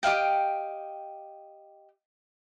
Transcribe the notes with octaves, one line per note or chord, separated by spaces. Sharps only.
G4 D#5 F5 G5